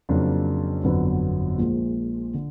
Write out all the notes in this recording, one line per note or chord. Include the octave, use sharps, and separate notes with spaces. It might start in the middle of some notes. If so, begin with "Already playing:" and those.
F2 C#3 F#3 A#3 D4
G1 F2 D3 F#3 B3
A#1 A#2 F3 G#3
D3